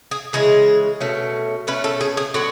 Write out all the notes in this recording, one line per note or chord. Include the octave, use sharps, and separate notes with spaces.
G#4
C#3 E3 G#3 G#4
B2 A3 C#4
B2 A3 C#4 B4
A4
G#4
G#4
D3 F#3 B3 F#4